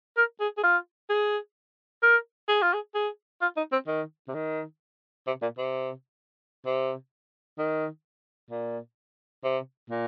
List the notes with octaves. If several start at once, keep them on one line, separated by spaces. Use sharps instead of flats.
A#4
G#4
G#4
F4
G#4
A#4
G#4
F4
G#4
G#4
F4
D#4
C4
D#3
C3
D#3
C3
A#2
C3
C3
D#3
A#2
C3
A#2